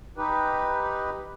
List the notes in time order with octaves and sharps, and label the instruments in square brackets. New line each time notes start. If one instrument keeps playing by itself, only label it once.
[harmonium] D#4 G4 B4